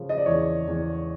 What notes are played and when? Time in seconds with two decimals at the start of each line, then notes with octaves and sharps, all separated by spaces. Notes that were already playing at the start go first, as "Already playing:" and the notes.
Already playing: C#3 F3
0.09 D#5
0.18 D5
0.26 E2 C#5
0.67 E2